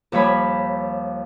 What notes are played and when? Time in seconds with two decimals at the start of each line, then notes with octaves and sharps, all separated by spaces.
0.12 D#2 F3 G3 C#5 B5